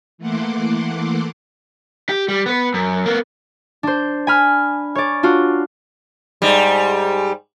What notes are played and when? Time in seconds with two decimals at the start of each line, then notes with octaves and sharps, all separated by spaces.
0.18 E3 A3 A#3 F#5 C6 D6
2.09 G4
2.28 G3
2.46 B3 B4
2.74 F#2
3.06 A#3 B3
3.83 D4 C5
4.27 G#5 B5 F6
4.95 C#5 D5
5.23 D4 F4 F#4
6.42 G#2 G3